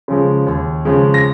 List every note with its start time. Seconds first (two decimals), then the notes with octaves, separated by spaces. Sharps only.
0.08 C#3 F3 G#3
0.47 D#2
0.85 C#3 F3 G#3
1.14 A#6